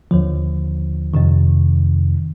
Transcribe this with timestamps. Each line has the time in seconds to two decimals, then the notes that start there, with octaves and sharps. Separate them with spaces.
0.11 D#2 D3 F3
1.14 F2 C3 D#3